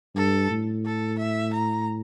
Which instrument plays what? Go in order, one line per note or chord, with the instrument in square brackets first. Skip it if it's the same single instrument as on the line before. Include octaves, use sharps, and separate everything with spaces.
[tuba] G2 [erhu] A4
[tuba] A2
[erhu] A4
E5
A#5